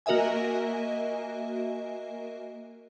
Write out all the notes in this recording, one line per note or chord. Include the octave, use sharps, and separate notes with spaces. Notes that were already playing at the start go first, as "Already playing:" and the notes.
A#3 F#4 A#4 D#5 E5 G#5